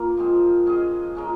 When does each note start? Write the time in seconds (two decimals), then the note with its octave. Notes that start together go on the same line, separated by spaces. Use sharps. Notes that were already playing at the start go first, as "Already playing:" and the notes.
Already playing: A#3 C#4 F4 A#4
0.17 F3 G#3 C4
0.66 G#3 C#4 G#4 D#5
1.15 G#3 C#4 F4 A#4